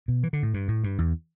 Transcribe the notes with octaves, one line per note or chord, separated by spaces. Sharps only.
B2
E3
D3
A2
G2
A2
G2
E2